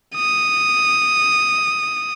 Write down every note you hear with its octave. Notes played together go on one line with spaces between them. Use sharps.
D#6